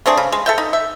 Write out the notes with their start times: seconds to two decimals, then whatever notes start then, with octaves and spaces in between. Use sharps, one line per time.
0.06 A3 C4 D4 G#4
0.17 C#3
0.32 G#3
0.46 A4 E5 G5
0.58 D#4
0.73 E5